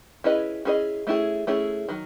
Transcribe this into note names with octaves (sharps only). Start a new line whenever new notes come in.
C#4 E4 G#4 B4 D#5
C#4 E4 G#4 B4 D#5
A3 C#4 E4 G#4
A3 C#4 E4 G#4
D#3 F#3